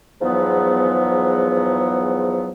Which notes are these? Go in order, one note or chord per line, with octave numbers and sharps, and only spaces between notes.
E2 G#2 F3 F#3 B3